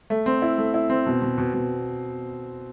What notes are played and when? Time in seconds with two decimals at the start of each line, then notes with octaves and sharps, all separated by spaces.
0.10 A3
0.26 C4
0.42 E4
0.58 A3
0.74 E4
0.90 C4
1.06 B2
1.22 B2
1.38 B2
1.54 B2